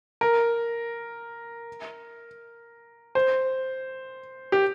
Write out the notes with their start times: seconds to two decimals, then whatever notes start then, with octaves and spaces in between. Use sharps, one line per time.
0.21 A#4
3.15 C5
4.52 G4